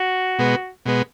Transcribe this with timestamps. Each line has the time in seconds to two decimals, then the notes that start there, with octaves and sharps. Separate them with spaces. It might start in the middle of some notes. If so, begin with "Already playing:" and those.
Already playing: F#4
0.39 B2 G#3 B3
0.86 B2 G#3 B3